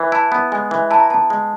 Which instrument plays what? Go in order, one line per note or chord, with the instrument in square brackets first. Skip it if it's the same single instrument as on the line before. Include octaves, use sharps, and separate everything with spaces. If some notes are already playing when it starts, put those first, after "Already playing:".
Already playing: [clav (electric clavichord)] E3
[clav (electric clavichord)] E4 [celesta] A5
[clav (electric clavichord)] B3
[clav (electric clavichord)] G#3 [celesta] G#5
[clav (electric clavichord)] E3
[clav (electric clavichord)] E4 [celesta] A5
[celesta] A#5
[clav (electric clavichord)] B3 [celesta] A5
[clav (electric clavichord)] G#3